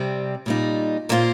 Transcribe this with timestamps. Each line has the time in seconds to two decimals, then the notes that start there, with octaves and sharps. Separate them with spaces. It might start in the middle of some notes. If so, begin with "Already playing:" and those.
Already playing: C3 G3 C4
0.46 A#2 G3 D#4
1.09 A#2 A#3 F4 C5